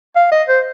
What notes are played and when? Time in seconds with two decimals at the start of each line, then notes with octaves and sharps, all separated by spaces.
0.16 F5
0.31 D#5
0.48 C5